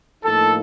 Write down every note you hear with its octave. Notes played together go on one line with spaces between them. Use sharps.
A2 F3 A#3 D#4 A4